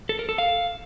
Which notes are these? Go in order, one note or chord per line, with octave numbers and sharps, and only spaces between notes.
A4
A#4
A4
F5